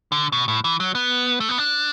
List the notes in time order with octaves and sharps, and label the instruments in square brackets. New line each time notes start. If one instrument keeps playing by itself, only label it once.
[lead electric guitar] D3
B2
A2
E3
F#3
B3
A3
B3
D4